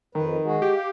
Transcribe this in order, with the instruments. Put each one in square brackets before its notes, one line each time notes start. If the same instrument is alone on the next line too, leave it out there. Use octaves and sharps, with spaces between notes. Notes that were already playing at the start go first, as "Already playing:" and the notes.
[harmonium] F2 B4 [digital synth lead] D#3
[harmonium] G#3 F#4 G#4
[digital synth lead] G4
[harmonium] F5